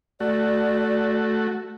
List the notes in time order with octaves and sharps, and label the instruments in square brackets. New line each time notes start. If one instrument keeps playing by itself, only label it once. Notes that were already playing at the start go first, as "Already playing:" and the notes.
[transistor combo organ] A3 F#4 [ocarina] D5